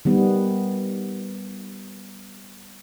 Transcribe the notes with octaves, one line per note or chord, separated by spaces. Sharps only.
D#3 G3 B3